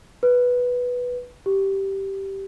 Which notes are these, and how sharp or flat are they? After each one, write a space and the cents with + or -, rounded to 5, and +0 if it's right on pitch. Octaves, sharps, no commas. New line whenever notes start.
B4 -5
G4 -10